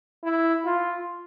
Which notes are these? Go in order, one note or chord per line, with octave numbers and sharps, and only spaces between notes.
E4
F4